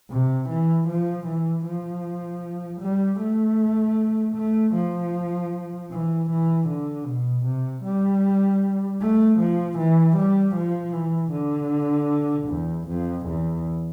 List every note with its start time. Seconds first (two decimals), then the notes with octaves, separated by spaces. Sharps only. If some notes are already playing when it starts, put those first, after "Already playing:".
0.10 C3
0.49 E3
0.88 F3
1.27 E3
1.66 F3
2.81 G3
3.20 A3
4.36 A3
4.74 F3
5.91 E3
6.30 E3
6.68 D3
7.06 B2
7.45 C3
7.84 G3
9.01 A3
9.39 F3
9.78 E3
10.17 G3
10.55 F3
10.93 E3
11.32 D3
12.48 E2
12.88 F2
13.27 E2